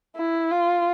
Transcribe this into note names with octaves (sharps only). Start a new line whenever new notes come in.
E4
F4